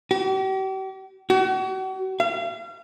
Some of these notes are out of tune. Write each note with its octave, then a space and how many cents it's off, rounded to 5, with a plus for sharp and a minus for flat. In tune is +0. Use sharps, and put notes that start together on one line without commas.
G4 -40
F#4 +40
F5 -35